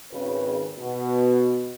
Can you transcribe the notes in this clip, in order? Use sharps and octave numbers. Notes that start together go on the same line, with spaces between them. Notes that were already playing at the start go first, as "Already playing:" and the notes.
G#1 C#3 B4
B2